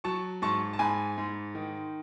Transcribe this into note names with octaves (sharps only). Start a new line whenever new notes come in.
F#3 A5 C#6
G#2 A5 C#6
A5
G#2 G#5 B5
G#2
D#3